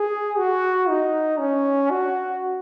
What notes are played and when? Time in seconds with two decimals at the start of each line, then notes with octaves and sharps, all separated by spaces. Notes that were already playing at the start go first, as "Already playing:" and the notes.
Already playing: G#4
0.38 F#4
0.89 D#4
1.39 C#4
1.91 F#4